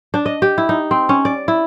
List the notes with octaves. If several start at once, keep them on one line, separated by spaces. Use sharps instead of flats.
D4
D#5
G4
E4
D#4
C4
C#4
D5
E4